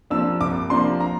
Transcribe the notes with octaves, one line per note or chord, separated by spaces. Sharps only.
C3 F3 A#3 D4 E6
C2 D6
C3 F3 A#3 D4 C6
A#5